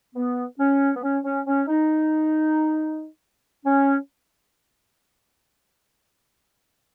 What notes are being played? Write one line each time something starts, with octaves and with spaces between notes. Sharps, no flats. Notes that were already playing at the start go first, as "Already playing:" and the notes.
B3
C#4
B3
C#4
C#4
C#4
D#4
C#4